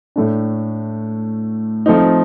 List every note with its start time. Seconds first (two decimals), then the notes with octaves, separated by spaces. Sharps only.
0.16 A2 A3 D4
1.86 F3 A3 C4 D#4